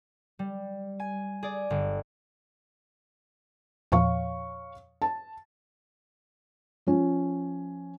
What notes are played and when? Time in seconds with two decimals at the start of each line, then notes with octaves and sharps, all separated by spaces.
0.39 G3
1.00 G#5
1.43 G#4 D5
1.70 G1
3.92 E2 A#2 F3 C#5 F5 C#6
5.02 A5
6.87 F3 C#4